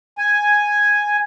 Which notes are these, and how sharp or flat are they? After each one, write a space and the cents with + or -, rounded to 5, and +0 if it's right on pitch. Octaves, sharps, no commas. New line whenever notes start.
G#5 +0